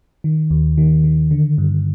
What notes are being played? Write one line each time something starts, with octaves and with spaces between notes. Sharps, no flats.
D#3
D#2
D#3
D#3
D3
G2